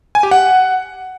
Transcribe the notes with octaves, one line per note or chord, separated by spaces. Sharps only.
G#5
G4
F#5